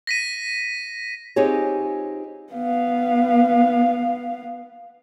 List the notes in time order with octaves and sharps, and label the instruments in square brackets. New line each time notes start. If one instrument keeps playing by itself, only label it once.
[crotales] A#6 B6 D#7
[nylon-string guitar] C4 D#4 F4 G4 G#4 C#5
[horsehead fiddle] B3 F5